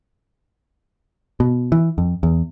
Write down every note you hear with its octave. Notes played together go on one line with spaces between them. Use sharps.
B2
E3
F2
E2